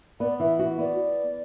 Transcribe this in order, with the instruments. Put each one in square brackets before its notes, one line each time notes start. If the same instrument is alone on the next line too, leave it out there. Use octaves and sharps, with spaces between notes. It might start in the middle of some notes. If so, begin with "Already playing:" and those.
[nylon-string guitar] B3 [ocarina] D5
[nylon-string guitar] E3 [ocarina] E5
[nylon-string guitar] F#4 [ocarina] E5
[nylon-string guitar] B3 [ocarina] D5